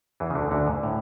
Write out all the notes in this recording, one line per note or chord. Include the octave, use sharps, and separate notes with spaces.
E2 E3
C#3
D2 D3
D2 D3
G#2
A2